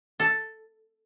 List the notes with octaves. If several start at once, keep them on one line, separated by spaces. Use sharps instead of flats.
A4